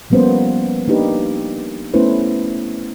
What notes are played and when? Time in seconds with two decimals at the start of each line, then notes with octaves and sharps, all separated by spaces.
0.10 F3 G3 A#3 B3 C#4 C5
0.88 A#3 D4 D#4 G4 B4
1.94 A3 B3 C#4 E4 B4 C5